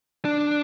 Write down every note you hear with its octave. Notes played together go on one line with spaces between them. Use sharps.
D4